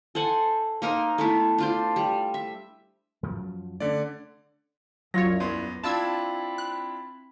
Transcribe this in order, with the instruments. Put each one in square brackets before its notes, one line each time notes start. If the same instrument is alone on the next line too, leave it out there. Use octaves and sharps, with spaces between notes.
[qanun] A4 C5 F#5 G#5
A#3 D#4 A#4 C5
A3 B3 E4
D4 F4 C5
G3
E5
[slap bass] F#2 F3 F#3
[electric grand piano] D3 D5 [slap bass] A3 C#4
[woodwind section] C2 F#2 [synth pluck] F#3 F4 C#5 [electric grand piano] A#6
[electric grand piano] E2 B3 C6
[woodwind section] C4 B5 [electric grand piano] D4 E4 F4 [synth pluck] A5 E6 G#6
[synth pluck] F#6